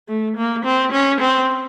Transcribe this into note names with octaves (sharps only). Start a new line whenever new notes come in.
A3
A#3
C4
C#4
C4